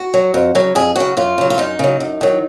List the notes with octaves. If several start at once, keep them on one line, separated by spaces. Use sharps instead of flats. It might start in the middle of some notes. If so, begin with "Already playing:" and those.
Already playing: F#4
F#3
F2
C#3 F#3
F2 G#4
C#3 F#3 F#4
F#2 F4
C#3 F#3
F4
F#2 D#4
C#3 F#3
F#2
D#3 F#3